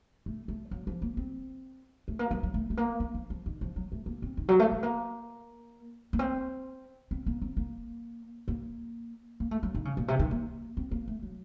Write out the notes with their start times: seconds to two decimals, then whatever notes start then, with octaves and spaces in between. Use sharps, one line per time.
0.26 A3
0.48 A3
0.71 F#3
0.87 F3
1.02 A#3
1.17 C4
2.08 A3
2.19 A#3
2.31 F#3
2.43 F#3
2.54 A3
2.70 A3
2.77 A#3
3.00 A#3
3.14 F3
3.30 F3
3.46 D#3
3.61 F3
3.76 F#3
3.92 A3
4.06 A#3
4.22 C4
4.37 D#3
4.49 F#3
4.60 A3
4.72 A3
4.83 A#3
6.13 A#3
6.19 C4
7.11 C4
7.26 A#3
7.42 C4
7.57 A#3
8.48 A#3
9.40 A#3
9.51 A3
9.63 F#3
9.75 D#3
9.85 C#3
9.97 A#2
10.08 C3
10.20 D#3
10.31 A#3
10.77 C4
10.91 A#3
11.08 A3
11.23 F#3